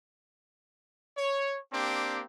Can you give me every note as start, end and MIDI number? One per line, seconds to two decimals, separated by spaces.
1.17 1.58 73
1.73 2.24 58
1.73 2.24 60
1.73 2.24 62
1.73 2.24 67